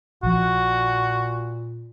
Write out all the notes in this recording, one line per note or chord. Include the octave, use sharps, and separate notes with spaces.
A#1 A#2 F3 F#4